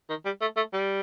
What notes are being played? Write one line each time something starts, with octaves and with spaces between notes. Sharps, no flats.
D#3
G3
A3
A3
G3